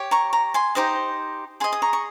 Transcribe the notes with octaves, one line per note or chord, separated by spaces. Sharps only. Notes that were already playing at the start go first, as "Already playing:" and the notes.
Already playing: G4 C#5
A#5 C#6
A#5 C#6
G#5 C6
D#4 G4 C5 D#5
G#4 D#5 G#5 C6
D#6
A#5 C#6
C#6